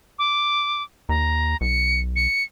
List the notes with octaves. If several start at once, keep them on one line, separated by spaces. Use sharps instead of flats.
D6
D#2 A#5
B1 C#7
C#7